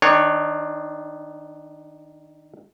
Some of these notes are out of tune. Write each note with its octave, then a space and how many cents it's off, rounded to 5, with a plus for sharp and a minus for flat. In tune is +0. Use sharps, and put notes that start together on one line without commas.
D#3 +0 D4 +20 C#5 +5